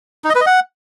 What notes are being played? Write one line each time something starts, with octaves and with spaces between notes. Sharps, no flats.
D#4
D#5
B4
D#5
F#5